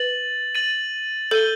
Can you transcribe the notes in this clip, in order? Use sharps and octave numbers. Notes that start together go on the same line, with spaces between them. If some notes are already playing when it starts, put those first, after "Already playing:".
Already playing: B4 A6 D#7 F#7
A6 D#7 F#7
A4 G6 D#7 G7